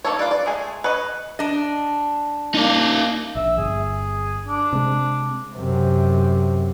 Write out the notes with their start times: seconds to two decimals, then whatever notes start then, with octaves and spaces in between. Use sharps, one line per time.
0.05 D#3 A#3 A4 C#5
0.19 F4 B4 D5
0.31 D5
0.46 G#3 A3 G#4
0.84 B4 C#5 D#5
1.39 D4 D#5
2.54 A#3 D#4 D5
3.35 A#1 E5
3.58 G1 G#4
4.48 D4
4.73 C3 G#3
5.55 F#2 C3